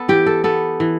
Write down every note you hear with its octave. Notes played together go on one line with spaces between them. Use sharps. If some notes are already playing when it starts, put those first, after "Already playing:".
Already playing: B3 A4
E3 G4
A4
B3 A4
E3